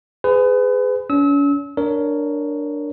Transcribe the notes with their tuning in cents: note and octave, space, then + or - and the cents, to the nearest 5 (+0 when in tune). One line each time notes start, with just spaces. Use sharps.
G#4 +0 B4 +35
C#4 +40 E6 -35
D4 +0 A#4 +0 C#5 +15